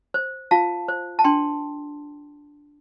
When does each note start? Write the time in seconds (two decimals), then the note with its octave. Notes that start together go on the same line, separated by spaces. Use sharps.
0.14 C5
0.51 F4 F5 A5
0.88 C5
1.19 A5
1.24 D4 G5 C6